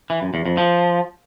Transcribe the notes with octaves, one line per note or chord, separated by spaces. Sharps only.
E3
F#2
E2
F2
F3